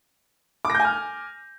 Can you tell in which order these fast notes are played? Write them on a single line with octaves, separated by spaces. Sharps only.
D6 A#6 G6 G#5 F6